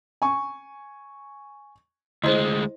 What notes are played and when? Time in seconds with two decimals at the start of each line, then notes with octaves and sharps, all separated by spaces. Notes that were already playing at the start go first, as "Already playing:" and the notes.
0.22 G#5 C#6
2.24 D2 G#3 E4 C5 D#5